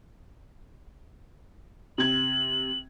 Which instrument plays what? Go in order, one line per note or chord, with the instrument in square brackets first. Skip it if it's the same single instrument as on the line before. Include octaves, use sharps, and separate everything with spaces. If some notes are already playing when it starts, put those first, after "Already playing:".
[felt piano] C3 G#6 [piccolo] F#7